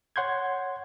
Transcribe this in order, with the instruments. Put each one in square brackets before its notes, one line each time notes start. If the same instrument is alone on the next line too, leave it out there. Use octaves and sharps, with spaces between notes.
[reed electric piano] C#5 F#5 C6 G6 G#6